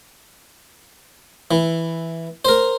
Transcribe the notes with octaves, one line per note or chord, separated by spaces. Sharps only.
E3
A#4 C5